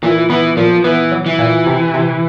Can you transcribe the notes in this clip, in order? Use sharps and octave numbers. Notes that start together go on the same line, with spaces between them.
A#2 E3
E3 B3
A#2 F3
E3 B3
F#3
E3
A#2
C3
C3